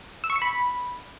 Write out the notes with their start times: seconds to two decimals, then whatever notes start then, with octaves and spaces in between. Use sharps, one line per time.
0.24 E6
0.30 C#6
0.36 C#7
0.42 B5